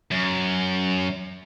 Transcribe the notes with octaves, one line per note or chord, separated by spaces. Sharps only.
F#2